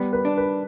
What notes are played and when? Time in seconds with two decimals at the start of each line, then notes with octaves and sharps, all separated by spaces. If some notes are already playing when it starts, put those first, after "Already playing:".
Already playing: G3 B3
0.13 B4
0.25 D4
0.37 B4